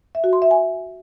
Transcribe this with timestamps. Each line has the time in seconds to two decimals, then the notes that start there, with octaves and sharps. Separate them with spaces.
0.15 E5
0.24 F#4
0.33 C6
0.42 E5
0.51 G#5